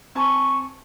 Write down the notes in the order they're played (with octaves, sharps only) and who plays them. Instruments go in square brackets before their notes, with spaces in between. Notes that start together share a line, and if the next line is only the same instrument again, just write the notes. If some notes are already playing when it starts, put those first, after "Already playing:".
[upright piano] C4 G#5 A5 [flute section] C#6